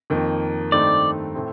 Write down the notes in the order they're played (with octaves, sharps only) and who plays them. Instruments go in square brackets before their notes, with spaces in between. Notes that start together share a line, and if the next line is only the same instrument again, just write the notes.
[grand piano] F2 D#3 A#3 D#4
[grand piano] G2 D#3 A3 C4 D#4 [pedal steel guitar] D5
[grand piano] A2 A3 C4